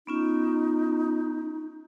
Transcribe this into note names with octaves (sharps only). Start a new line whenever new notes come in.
B3 C#4 D#4 F4